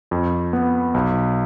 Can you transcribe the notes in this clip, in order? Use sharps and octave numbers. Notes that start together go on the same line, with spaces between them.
F2
B3
B1